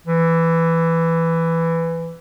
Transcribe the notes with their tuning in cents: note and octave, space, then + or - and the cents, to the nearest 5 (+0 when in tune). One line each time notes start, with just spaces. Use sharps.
E3 +10